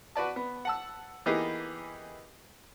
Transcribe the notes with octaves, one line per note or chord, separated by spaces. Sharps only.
F#4 B4 D5 A5
B3
F#5 A5 E6
E3 A#3 B3 D#4 G4 G#4